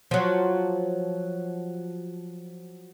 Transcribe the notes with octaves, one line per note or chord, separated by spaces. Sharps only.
F3 F#3